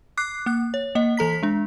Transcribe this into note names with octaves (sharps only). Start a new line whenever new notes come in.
D6 F#6 C7
A#3 F#6
C#5
A#3 D#5
E3 A4 A#5 B6
G#3 D4